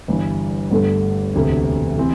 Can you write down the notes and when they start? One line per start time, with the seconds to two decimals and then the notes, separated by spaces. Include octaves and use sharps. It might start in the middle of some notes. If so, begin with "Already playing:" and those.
0.08 G1 G2 E3
0.71 G1 G2 D3 A3
1.34 E1 D2 C3 A3
1.98 C3 E3 C4